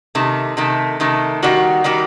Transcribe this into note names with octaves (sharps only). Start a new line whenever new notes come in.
C3 D#3 A3
C3 D#3 A3
C3 D#3 A3
D#3 G3 A#3 F#4
D#3 G3 A#3 F#4